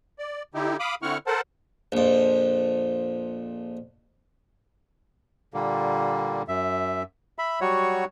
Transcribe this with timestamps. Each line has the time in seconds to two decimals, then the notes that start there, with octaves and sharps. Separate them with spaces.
0.19 D5
0.54 D3 D#4 E4 G4
0.79 F5 B5 D6 D#6
1.02 D3 C4 E4 F#5 C#6 F6
1.27 A4 A#4 C5 F#5 A5
1.92 A#1 F2
5.54 A#2 D3 G3 A#3
6.48 F#2 E5
7.39 E5 B5
7.61 F#3 G3 F#4 C#5